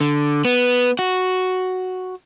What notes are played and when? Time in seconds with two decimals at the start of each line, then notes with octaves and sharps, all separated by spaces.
0.01 D3
0.45 B3
0.99 F#4